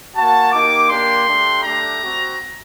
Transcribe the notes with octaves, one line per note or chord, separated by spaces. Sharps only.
A#3 F#4 A5
A#3 D#4 G4 D6
A#3 D4 G4 C6
A3 D4 G4
A3 D4 G4 A#5
C4 F#4